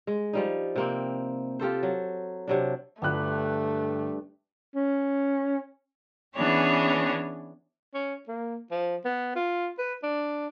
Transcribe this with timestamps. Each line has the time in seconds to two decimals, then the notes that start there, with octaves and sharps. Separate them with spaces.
0.07 G#3
0.33 F3 G3 D#4
0.76 C3 A#3 C4
1.59 F4 G4 A4 C5
1.83 F#3
2.47 C3 F#3 D4
3.02 G1 G2 G3 A3 B5 F#6
4.75 C#4
6.35 E3 B3 C#4 D4 G#4 C#5
7.94 C#4
8.28 A#3
8.71 F3
9.05 B3
9.36 F4
9.79 B4
10.03 D4